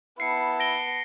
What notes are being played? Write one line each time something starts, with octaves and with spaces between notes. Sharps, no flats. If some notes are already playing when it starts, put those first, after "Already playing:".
B3 E4 A5 C7 C#7
A#6 D7 G7